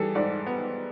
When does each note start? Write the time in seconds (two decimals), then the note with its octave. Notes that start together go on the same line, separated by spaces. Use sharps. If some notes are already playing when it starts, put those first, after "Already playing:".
Already playing: E3 G3 G#4 A4
0.15 G#2 D5
0.46 B3